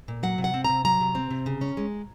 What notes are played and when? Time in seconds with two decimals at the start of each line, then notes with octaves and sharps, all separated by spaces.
0.08 A#2
0.23 F#3 F#5
0.38 C3
0.44 F#5
0.54 C4
0.64 C3 A#5
0.85 F#3 A#5
1.01 C3
1.15 C4
1.31 C3
1.46 C#3
1.61 C#4
1.77 G#3